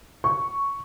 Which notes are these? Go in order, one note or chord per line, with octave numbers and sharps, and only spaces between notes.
C#6